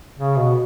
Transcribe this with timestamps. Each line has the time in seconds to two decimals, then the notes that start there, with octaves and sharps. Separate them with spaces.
0.17 C#3
0.36 B2